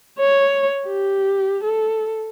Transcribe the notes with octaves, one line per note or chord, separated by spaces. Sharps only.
C#5
G4
A4